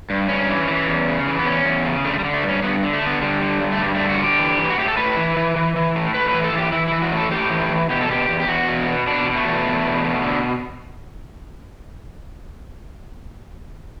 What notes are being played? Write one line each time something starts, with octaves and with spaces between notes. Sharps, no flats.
G2
G2 C#4
E3
E3
E2
C#3
E3
B3
E2 C#4
E2
C#3
D3 A3
G3
D3
A3
G2
C#4
G2 B3
D3
A3
D3
B3
D3 G3
D3
G2
A3
G2 G3
D3 A3
F#4
D3
G4
E3
E3
F#4
A2 G4
A4
A2 B4
E3
E3
E3
E3
A2
A2 B4
B4
E3
A4
E3 G4
E3 E4
E3 E4
F#4
A2 A4
A2 G4
E3
E3
B2 G4
A4
B2 G4
E2
G4
E2 F#4
B2
B2
B2 D4
B2
A3
E2
E2
B2
B2
D3